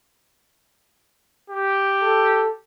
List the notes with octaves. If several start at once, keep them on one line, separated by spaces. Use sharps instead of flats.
G4
A4